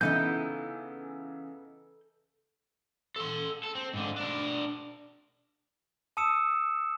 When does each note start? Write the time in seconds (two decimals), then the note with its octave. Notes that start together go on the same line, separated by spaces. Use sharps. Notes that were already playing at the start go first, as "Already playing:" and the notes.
0.01 C#3 E3 B3 D#4 E4 A4 G6
3.16 A4 C6
3.63 A4
3.75 C4
3.93 G#2 D3
4.16 D4 A#4
6.17 A5 D#6 E6 C#7 E7